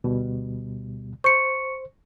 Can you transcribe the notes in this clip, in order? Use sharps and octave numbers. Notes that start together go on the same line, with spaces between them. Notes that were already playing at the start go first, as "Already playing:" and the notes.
D2 B2 G3
C5 C#6 C#7